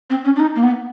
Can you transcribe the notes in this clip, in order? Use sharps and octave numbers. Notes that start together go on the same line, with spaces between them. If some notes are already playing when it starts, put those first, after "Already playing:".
C4
C#4
D4
D#4
A#3
B3